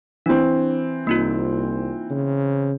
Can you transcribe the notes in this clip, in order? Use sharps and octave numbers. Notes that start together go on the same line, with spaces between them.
E3 C4 D4
C2 A#3 D#4 F4
C#3